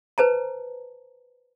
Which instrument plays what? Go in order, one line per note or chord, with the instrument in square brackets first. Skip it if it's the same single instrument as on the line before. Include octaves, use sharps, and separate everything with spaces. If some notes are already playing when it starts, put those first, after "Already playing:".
[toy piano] B4 C5 A5 A#5